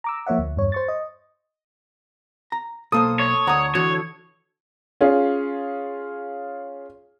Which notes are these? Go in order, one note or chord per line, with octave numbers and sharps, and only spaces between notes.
A#5 D6 E6
F3 A#3 C#5 E5 F#5
D2
E2 G2 C#5
C5 C#6 A6
D#5
A#5
B1 A#3 A4 C5 D#6
C#5
D2 F#5 A#5 C#6 D#6
D3 E3 F#4 C#5
C#4 F4 G#4